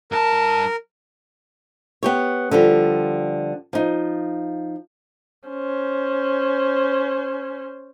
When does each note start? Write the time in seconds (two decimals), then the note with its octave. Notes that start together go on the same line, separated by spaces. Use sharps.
0.12 G2 A#4 A5
2.03 B3 G4 C#5
2.51 D3 F3 G3
3.73 F3 D#4
5.48 C#4 C5